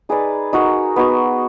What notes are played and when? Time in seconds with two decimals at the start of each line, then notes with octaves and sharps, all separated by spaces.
0.09 D#4 G#4 B4 D5
0.53 D#4 F#4 A#4
0.96 B3 D#4 F#4